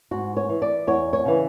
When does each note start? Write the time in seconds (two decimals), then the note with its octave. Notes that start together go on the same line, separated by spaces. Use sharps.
0.11 G#2 F#4
0.37 C#5
0.49 E3
0.62 D5
0.87 E2 C#5
1.13 C#5
1.25 C#3 E3